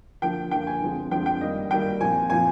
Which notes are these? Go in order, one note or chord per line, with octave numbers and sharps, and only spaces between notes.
D3 F3 A#3 G5
D3 F3 A#3 G5
G#5
D3 F3 G#3 C4
D3 F3 G#3 C4 G5
G5
D#3 G3 A#3 D#5
D#3 G3 A#3 G5
A#2 F3 C4 G#5
A#2 F3 C4 G#5